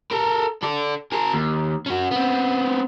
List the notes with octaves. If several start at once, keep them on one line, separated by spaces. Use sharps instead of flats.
A4 A#4
A4 D5
G#4 A#4
D#2
C#4 F#4
B3 C4